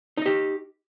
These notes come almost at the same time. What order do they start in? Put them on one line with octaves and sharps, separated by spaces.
D#4 D#5 G4